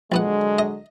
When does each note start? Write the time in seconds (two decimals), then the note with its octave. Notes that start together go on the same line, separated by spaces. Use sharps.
0.12 A#1 D3 F#3 G#3 B3 F#5
0.59 D#5